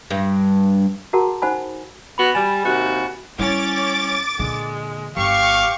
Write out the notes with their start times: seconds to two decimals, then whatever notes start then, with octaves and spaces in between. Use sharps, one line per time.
0.11 G2
1.13 F#4 G#4 A#4 F#5 A5 A#5
1.42 D#4 C5 F#5 G#5 B5
2.18 B3 F#4 B5
2.35 G3 G#5 A6 E7
2.64 D#2 C3 F#4
3.39 G3 C#4 E4 C#5 D6 A6
4.39 A#2 D3 G#3
5.17 G1 G4 F5 C#6 D6